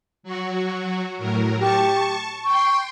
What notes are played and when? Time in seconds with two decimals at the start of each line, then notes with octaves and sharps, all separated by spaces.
0.23 F#3 F#4
1.18 A2 F#3 A#4
1.60 G4 A5 C#6
2.44 G5 C6 C#6